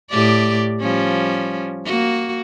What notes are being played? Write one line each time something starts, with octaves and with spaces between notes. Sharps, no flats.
A2 G4 D5
F3 G3 C#4
A#3 F#4